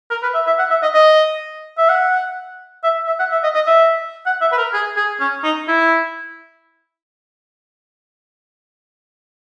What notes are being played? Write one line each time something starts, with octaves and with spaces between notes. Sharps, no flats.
A#4
B4
E5
E5
F#5
E5
D#5
D#5
E5
F#5
E5
E5
F#5
E5
D#5
D#5
E5
F#5
E5
B4
A#4
G#4
G#4
C#4
D#4
E4